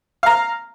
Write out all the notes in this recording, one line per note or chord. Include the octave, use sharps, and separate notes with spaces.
F5 A#5 F6